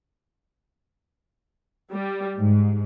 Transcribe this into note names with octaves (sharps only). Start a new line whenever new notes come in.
G3
G#2